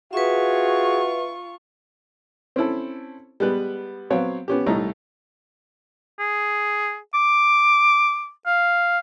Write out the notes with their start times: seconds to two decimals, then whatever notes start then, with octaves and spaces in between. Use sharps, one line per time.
0.13 F4 F#4 G#4 B4 E5 C#6
2.56 C4 C#4 E4 A4
3.40 G3 G#3 B3 B4
4.10 F#3 B3 C4 C#5 F5
4.48 B3 C#4 G4
4.66 C2 A3 D#4 C#5 D#5 A#5
6.19 G#4
7.14 D6
8.47 F5